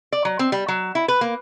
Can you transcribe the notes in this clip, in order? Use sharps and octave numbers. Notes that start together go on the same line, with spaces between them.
D5
F#3
C4
G3
F#3
E4
B4
A#3